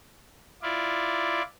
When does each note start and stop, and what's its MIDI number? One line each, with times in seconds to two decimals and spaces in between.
0.62 1.42 64
0.62 1.42 65
0.62 1.42 74